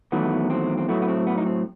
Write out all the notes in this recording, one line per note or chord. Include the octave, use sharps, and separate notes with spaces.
E2 D#3 F#3 A3 B3
C4
C4
A2 F#3 A3 B3
B3
C4
B3
D#4
C4